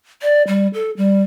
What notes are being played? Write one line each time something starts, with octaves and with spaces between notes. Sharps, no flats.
D5
G3
A4
G3